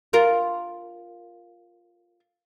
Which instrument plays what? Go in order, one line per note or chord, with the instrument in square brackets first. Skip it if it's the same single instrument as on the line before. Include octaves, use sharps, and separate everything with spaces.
[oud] F4 A#4